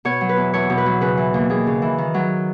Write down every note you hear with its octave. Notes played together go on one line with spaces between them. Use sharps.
B2 C#5
F#3
B4
E2
E2 C#5
B2
B4
F#3
C#3 B4
E3
D#2
D#2 G#4
C#3
E3
D#3
F#3